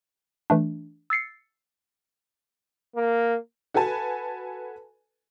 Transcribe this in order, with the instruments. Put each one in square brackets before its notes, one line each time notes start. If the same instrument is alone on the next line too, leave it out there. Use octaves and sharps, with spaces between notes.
[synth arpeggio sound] E3 A3 D4
E6 A6 C7 C#7
[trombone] A#3
[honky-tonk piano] F#4 A4 B4 G#5 A5